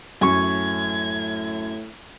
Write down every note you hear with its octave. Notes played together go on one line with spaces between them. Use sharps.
F#2 A2 G#5 C#6 G#6